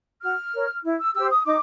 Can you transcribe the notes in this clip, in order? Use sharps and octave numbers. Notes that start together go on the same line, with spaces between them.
F#4 F6
A#4 C#5
E4
E6
G4 C5 E6
D#6
D#4 D6